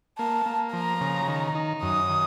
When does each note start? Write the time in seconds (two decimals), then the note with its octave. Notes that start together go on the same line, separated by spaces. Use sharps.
0.19 A#3 A5
0.46 A#3
0.73 F3 A#5
1.01 C#3
1.28 D#3
1.55 D#4
1.82 F#2 D#6
2.10 D#3